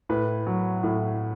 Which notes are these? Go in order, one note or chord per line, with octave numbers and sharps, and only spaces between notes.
A2 B4
F#3
A2